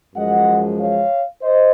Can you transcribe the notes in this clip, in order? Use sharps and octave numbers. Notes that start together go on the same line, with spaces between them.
F#2 F3 G#3 D#5 F#5
C#5 F5
C5 D#5